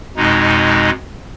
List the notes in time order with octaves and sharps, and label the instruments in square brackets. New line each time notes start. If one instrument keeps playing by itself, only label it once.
[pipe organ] F2 B2 G#3 D#4